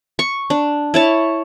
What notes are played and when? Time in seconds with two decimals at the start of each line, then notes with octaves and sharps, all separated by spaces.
0.19 C#6
0.50 D4
0.94 E4 C#5 A5